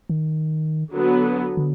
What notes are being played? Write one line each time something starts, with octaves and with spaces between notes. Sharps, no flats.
D#3
D3 F#3 B3
D3